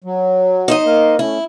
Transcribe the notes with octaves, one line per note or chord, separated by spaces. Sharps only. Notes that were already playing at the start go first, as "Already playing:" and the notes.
F#3
D#4 C5 D#5
A#3 A#4 F5
A3 C#4 E4